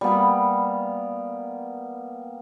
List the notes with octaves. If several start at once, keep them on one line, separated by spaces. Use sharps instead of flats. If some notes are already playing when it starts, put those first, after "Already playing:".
G3 A#3 B3